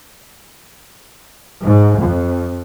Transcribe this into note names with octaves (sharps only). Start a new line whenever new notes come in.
G#2
F2